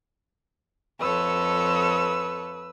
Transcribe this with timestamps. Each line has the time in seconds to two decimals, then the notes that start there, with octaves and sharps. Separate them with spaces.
0.99 F2 A4 B4 C#5 E6